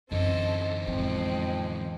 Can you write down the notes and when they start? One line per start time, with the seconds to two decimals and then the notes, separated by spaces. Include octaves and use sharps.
0.12 F#2 D3 E3 B3 C4 A4 D#5
0.87 F2 A2 G#3 B3 C4